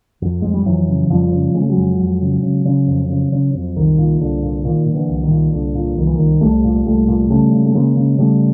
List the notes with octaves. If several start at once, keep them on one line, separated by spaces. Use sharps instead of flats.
F2
F2 G#3
G3
F2 E3 F#3
C#3
F2 F3 G3
C#3
C#3 G#3
A3
F#3 G#3
F2
F2
C#3
C#3
C#3
F2
C#3
C#3
F2
C2 D#3
A#2
C2 D3
A#2
A#2 D#3
A#2
D3 E3
C2
D#3
A#2
C2 D3
A#2
C2 D#3
E3
C2 D#3
C2 G3 A3
A#2
C2 G3 A3
A#2
C#3 G3 A3
C#3
A3
C#3 G#3 A#3
C#3
C#3 G3 A3